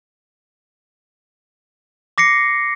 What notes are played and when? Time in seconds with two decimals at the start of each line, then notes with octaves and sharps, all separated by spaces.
2.18 D6 A#6 C7 C#7